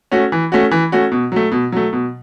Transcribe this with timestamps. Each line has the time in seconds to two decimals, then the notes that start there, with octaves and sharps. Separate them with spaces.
0.12 A3 C#4 F#4
0.32 E3
0.52 A3 C#4 F#4
0.71 E3
0.92 A3 C#4 F#4
1.12 B2
1.32 F#3 A3
1.52 B2
1.72 F#3 A3
1.93 B2